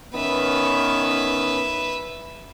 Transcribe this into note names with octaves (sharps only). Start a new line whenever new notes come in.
D#3 B3 C#4 B4 E5